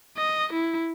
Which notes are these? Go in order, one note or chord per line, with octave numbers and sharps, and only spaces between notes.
D#5
E4